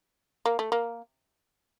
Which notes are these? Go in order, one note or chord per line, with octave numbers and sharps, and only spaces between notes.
A#3
A3
A#3